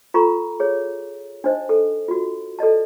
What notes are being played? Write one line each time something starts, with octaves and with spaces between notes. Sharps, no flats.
F4 A4 A#5 C#6
G#4 C#5
D4 D#4 C5 D#5
A4
F4 F#4
A4 D5 D#5 A5